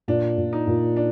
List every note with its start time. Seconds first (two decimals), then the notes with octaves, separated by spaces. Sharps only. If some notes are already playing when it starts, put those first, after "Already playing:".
0.08 A#2 D4
0.38 A#2
0.53 D#4
0.67 A#2
0.96 D4